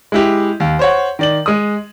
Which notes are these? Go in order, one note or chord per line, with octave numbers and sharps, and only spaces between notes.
G#3 E4 G4
D#2
C5 C#5 F#5
D#3 D5 F#7
G#3 D#6